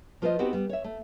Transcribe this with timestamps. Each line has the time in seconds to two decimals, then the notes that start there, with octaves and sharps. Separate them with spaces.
0.22 F3 F4 B4 C5 D#5
0.39 B3 C4 D#4 F#4 G4 B4
0.53 G3 B3
0.69 C#5 E5
0.84 A3